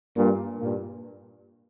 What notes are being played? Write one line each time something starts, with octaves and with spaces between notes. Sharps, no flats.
G2 A#2
G2 A#2